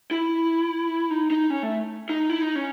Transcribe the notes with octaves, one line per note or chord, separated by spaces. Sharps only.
E4
D#4
D#4
C#4
A3
D#4
E4
D#4
C#4